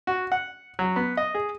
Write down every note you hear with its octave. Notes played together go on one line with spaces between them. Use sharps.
F#4
F#5
F#3
B3
D#5
G#4